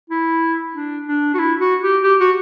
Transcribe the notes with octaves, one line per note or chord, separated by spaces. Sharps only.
E4
D4
D4
F#4
E4
F#4
G4
G4
F#4